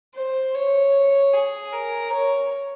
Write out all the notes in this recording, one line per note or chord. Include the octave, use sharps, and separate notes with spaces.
C5
C#5
G#4
A#4
C#5